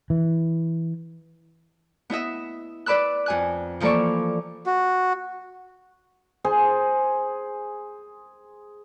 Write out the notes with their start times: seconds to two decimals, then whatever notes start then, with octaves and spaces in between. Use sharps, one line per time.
0.10 E3
2.10 B3 E4 D#5 E5
2.86 B4 D5 B5 E6 F#6
3.26 F2 G#5 F#6
3.80 E3 F3 A#3 A4 D5 C#6
4.66 F#4
6.44 G#4 C5